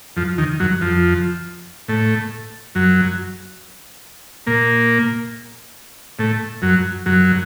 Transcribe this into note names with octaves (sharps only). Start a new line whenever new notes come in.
F2 F3
D#2 D#3
F#2 F#3
F2 F3
A2 A3
F#2 F#3
A#2 A#3
A2 A3
F#2 F#3
F#2 F#3